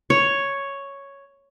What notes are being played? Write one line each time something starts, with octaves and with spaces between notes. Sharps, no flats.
C#5